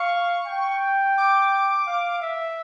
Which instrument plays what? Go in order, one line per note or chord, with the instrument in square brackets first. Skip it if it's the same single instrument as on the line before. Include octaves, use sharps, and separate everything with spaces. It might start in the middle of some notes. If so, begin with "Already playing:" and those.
Already playing: [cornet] F5 [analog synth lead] C#6
[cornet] G5
[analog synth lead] D6
[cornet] F5
E5